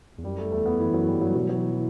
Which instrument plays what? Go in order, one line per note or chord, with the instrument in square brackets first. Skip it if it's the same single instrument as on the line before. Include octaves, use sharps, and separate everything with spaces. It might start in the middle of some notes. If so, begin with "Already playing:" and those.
[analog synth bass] E2
[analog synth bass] F#2 [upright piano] G3
[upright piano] A3
[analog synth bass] E2 [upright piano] A3
[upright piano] B3
[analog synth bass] F#2 [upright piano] E3
[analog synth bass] F#2 [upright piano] F#3
[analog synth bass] G2 [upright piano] G3
[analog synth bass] G2 [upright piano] F#3
[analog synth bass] B2 [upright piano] F#3
[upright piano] F#3
E3
E3